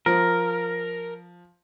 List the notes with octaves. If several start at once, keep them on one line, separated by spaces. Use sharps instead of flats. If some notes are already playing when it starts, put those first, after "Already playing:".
F3 A#4